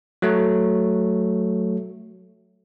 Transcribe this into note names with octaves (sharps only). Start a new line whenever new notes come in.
F#3 A3